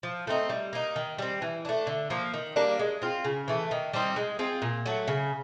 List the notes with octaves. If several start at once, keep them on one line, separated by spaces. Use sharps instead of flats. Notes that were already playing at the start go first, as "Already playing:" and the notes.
F3
A3 C4 D#4
G3
A#3 D#4
D#3
G3 C4
E3
A3 D4
D3
F3 A#3
D#3
G3 A#3 D4
G#3
C4 F4
C#3
E3 A3
D#3
G3 C4 D#4
G#3
C4 F4 G#4
A#2
F#3 A3
C#3